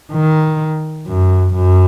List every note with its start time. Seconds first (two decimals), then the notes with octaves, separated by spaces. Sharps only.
0.12 D#3
1.07 F#2
1.54 F#2